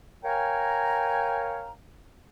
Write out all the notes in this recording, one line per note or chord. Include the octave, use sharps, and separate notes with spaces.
A#4 C#5 F5 G5 G#5 A#5